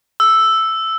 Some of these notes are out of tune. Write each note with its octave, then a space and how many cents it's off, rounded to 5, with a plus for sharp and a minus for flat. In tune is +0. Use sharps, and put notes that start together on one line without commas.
E6 +0